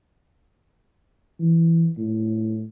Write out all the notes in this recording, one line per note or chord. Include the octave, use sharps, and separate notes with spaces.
E3
A2